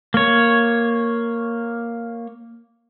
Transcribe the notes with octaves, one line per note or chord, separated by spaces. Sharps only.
A#3 C#5